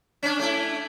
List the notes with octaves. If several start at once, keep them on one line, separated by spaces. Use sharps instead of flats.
C#4 D4
A3 E4